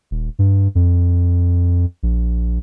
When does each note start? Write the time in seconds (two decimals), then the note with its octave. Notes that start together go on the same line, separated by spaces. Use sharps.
0.11 D#1
0.39 G2
0.75 F2
2.03 A#1